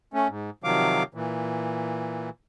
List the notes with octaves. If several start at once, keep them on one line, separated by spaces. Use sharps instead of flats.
A3 C#4
G#2
C3 D#3 F3 F#3 F5 D6
A#2 E3